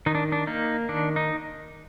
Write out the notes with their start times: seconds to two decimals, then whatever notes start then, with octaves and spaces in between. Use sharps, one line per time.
0.06 D#3 D#4
0.15 D4
0.32 D4
0.47 A#3 D#4
0.89 D#3 D4
1.16 D#4